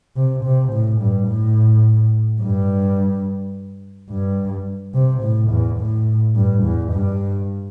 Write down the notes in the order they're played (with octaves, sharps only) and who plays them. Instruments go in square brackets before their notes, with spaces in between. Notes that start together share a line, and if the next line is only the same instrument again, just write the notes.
[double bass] C3
C3
A2
G2
A2
G2
G2
C3
A2
E2
A2
G2
E2
G2